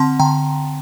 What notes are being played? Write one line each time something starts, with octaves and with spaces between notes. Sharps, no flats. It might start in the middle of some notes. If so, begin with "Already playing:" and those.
Already playing: D3 C4 F#5 A5 C6
D3 G5 A#5